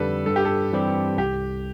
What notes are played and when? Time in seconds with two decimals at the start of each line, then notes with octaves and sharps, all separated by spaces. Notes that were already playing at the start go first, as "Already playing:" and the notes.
Already playing: F2 D3 G3 A4 B4
0.26 G2 A4
0.36 G4
0.45 A4
0.72 E3 G3 C4 G4
1.18 C2 G4